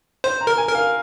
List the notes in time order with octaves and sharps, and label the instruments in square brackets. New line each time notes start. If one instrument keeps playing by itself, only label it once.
[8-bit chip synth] C5 [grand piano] C6
[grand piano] A#5
[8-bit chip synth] A#4
[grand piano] G#5
[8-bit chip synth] A#4
[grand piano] F5